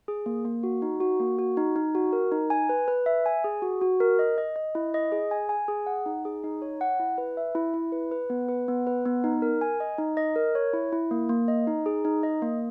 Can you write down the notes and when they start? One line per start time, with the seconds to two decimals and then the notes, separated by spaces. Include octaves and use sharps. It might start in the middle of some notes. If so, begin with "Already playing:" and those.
0.08 G#4
0.26 A#3
0.45 A#3
0.63 F#4
0.82 D#4
1.00 F#4
1.20 A#3
1.39 F#4
1.57 D#4
1.76 D#4
1.95 F#4
2.13 A#4
2.32 D#4
2.50 G#5
2.69 B4
2.88 B4
3.06 E5
3.26 G#5
3.44 G#4
3.62 F#4
3.81 F#4
4.00 A#4
4.19 D#5
4.38 D#5
4.56 D#5
4.75 E4
4.94 D#5
5.12 G#4
5.31 G#5
5.49 G#5
5.68 G#4
5.87 F#5
6.06 D#4
6.25 G#4
6.44 D#4
6.62 C#5
6.81 F#5
6.99 E4
7.18 B4
7.37 E5
7.55 E4
7.74 E4
7.92 B4
8.12 B4
8.30 B3
8.48 B4
8.68 B3
8.87 B4
9.06 B3
9.24 D#4
9.42 A#4
9.61 G#5
9.80 D#5
9.98 D#4
10.17 D#5
10.36 A#4
10.55 C#5
10.73 E4
10.92 E4
11.11 A#3
11.29 A#3
11.48 D#5
11.67 D#4
11.86 G#4
12.05 D#4
12.23 D#5
12.42 A#3